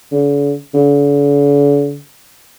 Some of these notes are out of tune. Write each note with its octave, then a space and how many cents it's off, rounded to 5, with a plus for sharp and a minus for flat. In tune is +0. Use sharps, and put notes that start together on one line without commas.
D3 -45
D3 -45